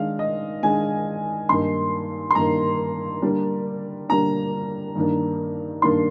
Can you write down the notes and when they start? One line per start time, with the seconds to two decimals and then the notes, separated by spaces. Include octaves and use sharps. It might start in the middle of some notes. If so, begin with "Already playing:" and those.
Already playing: D#3 G#3 D4 F5
0.19 D#5
0.63 D#3 G#3 D4 G#5
1.49 G2 D#3 A#3 D#4 C6
2.31 C6
2.35 G2 D#3 A#3 D#4 A#5
3.22 D3 G3 A#3 D4
4.09 D3 G3 A#3 D4 A#5
4.96 G2 D#3 A#3 D4
5.82 G2 D#3 A#3 D4 C6